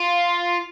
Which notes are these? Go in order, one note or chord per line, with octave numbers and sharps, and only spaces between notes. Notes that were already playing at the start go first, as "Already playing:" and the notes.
Already playing: F4